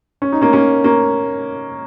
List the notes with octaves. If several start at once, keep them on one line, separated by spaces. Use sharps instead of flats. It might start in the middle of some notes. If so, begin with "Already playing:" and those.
C#4
D#4
A#3 C#4
A#3 C#4
A#3 C#4